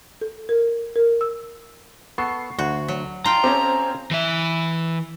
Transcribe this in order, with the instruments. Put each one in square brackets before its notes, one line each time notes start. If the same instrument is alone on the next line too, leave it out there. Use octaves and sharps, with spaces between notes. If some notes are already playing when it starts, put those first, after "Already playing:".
[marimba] A4
A#4
A#4
E6
[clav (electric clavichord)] B3 A4 [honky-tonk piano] C#6 C7
[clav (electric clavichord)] D2 [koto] F#4
[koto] F#3
[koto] F4 G5 [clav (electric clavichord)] A5 [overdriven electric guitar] A#5
[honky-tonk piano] C4 C#4 [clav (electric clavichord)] G4 A4 D#5
[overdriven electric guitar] E3 E5